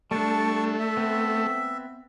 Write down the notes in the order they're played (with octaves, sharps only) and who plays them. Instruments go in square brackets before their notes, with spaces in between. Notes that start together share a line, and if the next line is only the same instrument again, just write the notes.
[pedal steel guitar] G3 D4 [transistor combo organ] A3 [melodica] A5 C#6
[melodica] E5
[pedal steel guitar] B3 C4